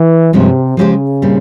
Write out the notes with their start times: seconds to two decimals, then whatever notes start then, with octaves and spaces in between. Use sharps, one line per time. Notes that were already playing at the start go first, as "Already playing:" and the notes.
Already playing: E3
0.33 G2 C3 F3 G#3 C#4
0.77 C#3 F3 G#3 E4 G4 C5
1.22 A#2 G3 C4